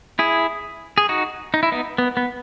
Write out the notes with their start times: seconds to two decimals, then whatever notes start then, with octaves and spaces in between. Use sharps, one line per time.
0.19 E4 G#4
0.98 G#4
1.09 D#4 F#4
1.54 D#4
1.63 E4
1.72 B3 D#4
1.98 B3
2.17 B3